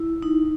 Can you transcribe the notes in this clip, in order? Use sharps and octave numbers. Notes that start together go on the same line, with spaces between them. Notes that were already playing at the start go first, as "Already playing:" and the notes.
Already playing: E4
D#4